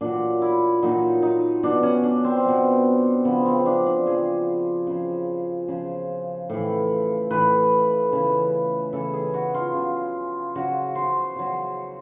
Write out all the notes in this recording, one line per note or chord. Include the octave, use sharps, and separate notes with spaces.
A#2 F#3 D4
E4
A#2 F#3 D#4
D#4
B2 F#3 D4
C#4
D4
C4
B2 F#3
C#3 F3 B3
C4
D4
D4
C#3 F3 G#4
C#3 F3
C#3 F3
A2 E3
A2 E3 B4
C#3 E3
C#3 E3 A4
G#4
F#4
F4
C#3 F#3
C#3 F#3 F#4
C5
C#3 F#3